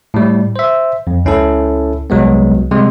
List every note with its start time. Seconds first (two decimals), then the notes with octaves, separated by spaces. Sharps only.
0.14 A2 G3
0.56 C5 E5
1.07 F2
1.25 C#2 C#4 E4 A4
2.10 C2 F#3 G#3 B3
2.71 C3 G3 G#3